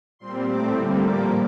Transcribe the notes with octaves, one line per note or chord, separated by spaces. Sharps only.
A#2 G3 C4 C6
A2 A3 C4 D6
D3 G3 A#3
A#2 F3 A#3 D6